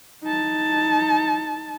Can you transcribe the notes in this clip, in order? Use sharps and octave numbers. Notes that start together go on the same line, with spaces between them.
D#4 A5